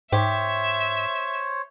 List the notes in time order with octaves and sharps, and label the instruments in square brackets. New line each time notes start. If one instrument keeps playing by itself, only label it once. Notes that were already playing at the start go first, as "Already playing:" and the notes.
[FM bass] G#2 [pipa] G4 [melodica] C5 C#5 [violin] E5